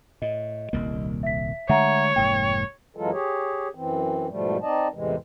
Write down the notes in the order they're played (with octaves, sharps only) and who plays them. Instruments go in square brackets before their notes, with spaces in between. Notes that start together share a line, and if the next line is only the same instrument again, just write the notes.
[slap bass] A2 [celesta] D#5
[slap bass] D#1 C2 A#3
[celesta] E5 B6
[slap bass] D3 G#3 A3 [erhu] C#5 [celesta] E5 F#5 A#5
[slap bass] F1 G#2 A#3 [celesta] G5
[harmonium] F#2 E3 F#3 G#3 F4 A4
G4 G#4 C#5
F#2 E3 C4
G#2 B2 F3 G3 A3
C4 D#4 D5 D#5 A5
E2 A2 C3 E3 G#3